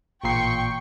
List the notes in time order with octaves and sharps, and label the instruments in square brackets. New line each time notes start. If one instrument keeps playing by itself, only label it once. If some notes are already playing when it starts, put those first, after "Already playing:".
[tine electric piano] A1 A#2 C7 [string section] G5 C#6